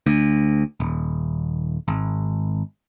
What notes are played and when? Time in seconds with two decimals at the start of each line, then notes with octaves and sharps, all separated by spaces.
0.06 D2
0.80 D#1
1.88 G#1